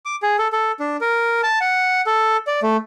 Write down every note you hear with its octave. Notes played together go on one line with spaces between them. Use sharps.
D6
G#4
A4
A4
D4
A#4
A5
F#5
A4
D5
A3